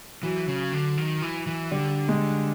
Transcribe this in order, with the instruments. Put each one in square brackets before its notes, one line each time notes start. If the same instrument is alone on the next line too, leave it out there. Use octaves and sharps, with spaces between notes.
[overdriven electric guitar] E3 [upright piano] F#3
[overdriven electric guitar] C#3
D3
D#3
E3
E3
[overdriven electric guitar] D3 [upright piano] G3
[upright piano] G#3